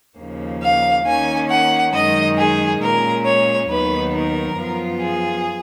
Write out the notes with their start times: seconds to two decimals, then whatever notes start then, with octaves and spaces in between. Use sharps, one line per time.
0.18 D#2 C#3 F3 A#3
0.62 F5
1.05 D#3 A#3 C#4 G#5
1.50 F#5
1.93 F#2 D#3 G#3 D#5
2.38 G#4
2.81 A#2 G#3 C#4 A#4
3.25 C#5
3.69 D#2 D#3 F#3 B3 B4
4.13 A#4
4.57 F#2 F3 B3 F4
5.01 G#4